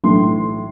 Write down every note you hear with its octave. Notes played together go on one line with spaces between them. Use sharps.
B1 A2 E3 C6